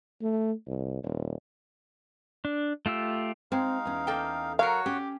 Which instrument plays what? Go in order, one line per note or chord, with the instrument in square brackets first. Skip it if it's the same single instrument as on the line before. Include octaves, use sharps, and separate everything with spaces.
[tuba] A3
C2
D#1
[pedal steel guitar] D4
A3 F4 G4 E6
[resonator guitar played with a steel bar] G#3 [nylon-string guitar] C4 [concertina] D#4 F5
[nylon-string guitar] E2 C#4
[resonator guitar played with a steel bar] A#3 A4 G5
[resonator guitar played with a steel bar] F#3 A4 A#4 [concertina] F#4 C#5 [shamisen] F5
[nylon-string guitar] C#4 [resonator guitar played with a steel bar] G4